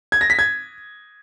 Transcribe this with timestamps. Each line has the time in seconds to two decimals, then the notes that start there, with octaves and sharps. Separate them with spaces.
0.12 G#6
0.21 A#6
0.30 B6
0.39 G#6